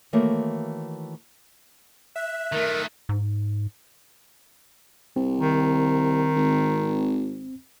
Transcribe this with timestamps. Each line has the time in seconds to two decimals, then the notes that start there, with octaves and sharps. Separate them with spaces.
0.13 D#3 E3 A3 A#3 F#4 C#5
2.16 E5 F#6
2.52 D#3 A3 A#4
3.09 G#2
5.16 C2 C4
5.39 D#3
6.36 G#1